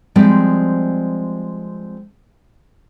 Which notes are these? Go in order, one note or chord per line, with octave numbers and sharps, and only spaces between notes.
F3 G3 G#3 C4